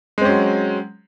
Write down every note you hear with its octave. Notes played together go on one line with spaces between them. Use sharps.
F#3 G#3 C4 C#4